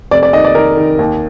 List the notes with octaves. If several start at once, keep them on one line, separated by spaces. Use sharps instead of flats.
F1 D5
D5
D#3 D#5
D5
D#3 A#4
D#3
D#2